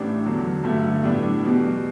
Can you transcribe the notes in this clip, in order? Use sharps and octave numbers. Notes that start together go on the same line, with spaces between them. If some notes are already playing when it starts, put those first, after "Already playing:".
Already playing: A1 A2 G3 D4
E2 D3 F#3
G2 D3 A3
A2 G3 B3 D4
E2 B2 G3